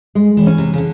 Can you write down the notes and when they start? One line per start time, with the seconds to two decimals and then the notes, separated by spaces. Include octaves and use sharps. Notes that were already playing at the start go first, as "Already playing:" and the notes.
0.15 G#3
0.37 E3
0.46 C#4
0.58 C3
0.73 C#3
0.78 D3